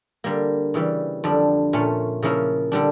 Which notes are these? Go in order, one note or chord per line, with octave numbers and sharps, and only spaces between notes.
D3 G3 A#3
C#3 E3 G3
F2 D3 G3 D4
A#2 A3 C#4
C#3 F3 A#3 C#4 E4
D3 G3 D4